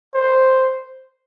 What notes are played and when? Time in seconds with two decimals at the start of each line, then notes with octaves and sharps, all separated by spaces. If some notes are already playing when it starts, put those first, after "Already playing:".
0.15 C5